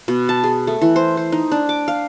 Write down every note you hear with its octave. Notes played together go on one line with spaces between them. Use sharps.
B2
A5
G#4
A3
E3
C5
C5
D#4
D4
D6
F5